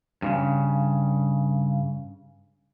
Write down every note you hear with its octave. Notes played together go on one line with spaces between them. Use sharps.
G2 A#2 C#3